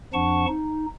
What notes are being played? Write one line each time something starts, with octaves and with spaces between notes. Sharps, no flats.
F2 F3 D4 F#5 A5 C#6
D#4